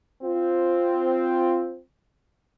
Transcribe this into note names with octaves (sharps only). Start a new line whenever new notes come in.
C4 F4